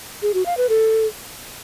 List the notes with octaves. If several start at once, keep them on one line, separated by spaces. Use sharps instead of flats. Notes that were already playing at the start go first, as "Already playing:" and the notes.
G#4
F#4
F5
B4
A4